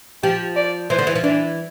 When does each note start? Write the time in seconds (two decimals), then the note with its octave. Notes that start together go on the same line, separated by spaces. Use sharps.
0.23 F3 G4
0.56 D5
0.90 E3 C5
0.99 D3
1.07 E3
1.16 F3
1.24 E3 D4